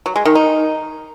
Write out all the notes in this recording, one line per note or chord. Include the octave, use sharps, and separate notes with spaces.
F#3
G#3
D#3
D#4